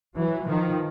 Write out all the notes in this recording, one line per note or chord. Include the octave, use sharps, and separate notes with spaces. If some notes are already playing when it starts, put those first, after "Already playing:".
E3 F#3
D#3 F3